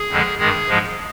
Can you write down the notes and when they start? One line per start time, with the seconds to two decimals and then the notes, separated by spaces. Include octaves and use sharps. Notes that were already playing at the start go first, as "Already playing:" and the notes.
Already playing: G#4
0.09 F2 D3 F3 G#3
0.38 G2 D#3 G#3 G#4
0.68 G#2 F3 G#3